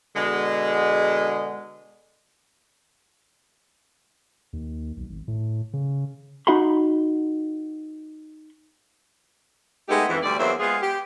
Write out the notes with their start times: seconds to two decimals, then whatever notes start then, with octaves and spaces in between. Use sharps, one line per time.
0.16 B2 D3 G#3
4.53 D#2
4.97 B1
5.10 G#1
5.28 A2
5.73 C#3
6.47 D#4 F#4 F#5 B5 C6
9.89 G#3 A3 B3 D#4 G4
10.09 F2 E3
10.23 D2 G3 D5
10.39 E2 F#3 A#3 C5 E5
10.60 G#3 B3 F4 G#4
10.81 G4